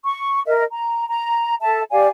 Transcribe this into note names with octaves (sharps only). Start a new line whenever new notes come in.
C#6
A#4 D#5 E5
A#5
A#5
A4 E5 A5
G4 D5 F5 G#5